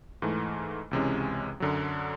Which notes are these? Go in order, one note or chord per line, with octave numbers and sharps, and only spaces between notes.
G#2 E3 A3
C#2 C3 E3 G#3 C#4
F#2 D3 F#3